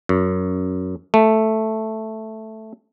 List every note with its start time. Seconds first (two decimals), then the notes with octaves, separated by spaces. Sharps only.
0.09 F#2
1.14 A3